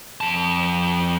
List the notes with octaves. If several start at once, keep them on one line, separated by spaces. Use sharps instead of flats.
F2 A5